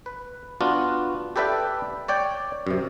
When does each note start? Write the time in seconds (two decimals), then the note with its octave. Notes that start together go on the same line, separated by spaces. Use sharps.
0.06 B4
0.61 B3 D4 F4 F#4
1.36 G4 A4 B4 D5 E5 G5
2.08 C#5 D5 G5
2.67 F#2 C3